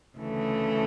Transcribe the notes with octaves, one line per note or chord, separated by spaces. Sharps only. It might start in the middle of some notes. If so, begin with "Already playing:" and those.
D2 C#3 E3 A3